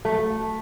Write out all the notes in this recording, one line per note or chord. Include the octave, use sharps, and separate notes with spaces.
A3